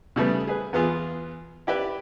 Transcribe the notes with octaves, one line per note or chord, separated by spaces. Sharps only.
C#3 G3 A3 B3
G#4 B4
E2 B3 F4 G#4
E4 G4 B4 D5 E5